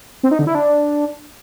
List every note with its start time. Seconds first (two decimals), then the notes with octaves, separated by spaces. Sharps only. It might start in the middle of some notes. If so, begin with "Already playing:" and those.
0.23 C4
0.31 D#4
0.39 D3
0.47 E4
0.55 D4